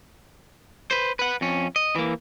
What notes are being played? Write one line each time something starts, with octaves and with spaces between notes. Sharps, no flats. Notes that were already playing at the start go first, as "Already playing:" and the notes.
B4 C5
B4 F#5
F2 C#4
D#5
E3 A#3